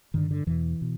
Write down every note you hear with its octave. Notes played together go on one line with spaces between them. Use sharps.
G2 D3 D#3
D3
E2 B2 E3
B2